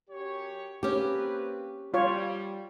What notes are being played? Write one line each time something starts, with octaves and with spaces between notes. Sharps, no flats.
F#2 G4 C#5
A#3 C4 C#4 G4 B4
G3 F4 C#5